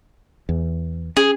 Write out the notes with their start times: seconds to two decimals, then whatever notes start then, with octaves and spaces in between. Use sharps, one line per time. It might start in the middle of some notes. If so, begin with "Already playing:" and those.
0.49 E2
1.17 C#4 G#4